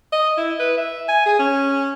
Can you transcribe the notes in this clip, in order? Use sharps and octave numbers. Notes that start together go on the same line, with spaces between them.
D#5
E4
B4
E5
G#5
G#4
C#4